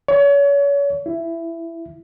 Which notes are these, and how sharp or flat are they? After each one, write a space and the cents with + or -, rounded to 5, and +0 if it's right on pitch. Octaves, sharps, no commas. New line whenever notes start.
C#5 +35
E4 +15